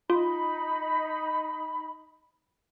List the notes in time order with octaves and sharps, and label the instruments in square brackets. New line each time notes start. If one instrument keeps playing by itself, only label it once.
[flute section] D#4 B5 [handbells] F4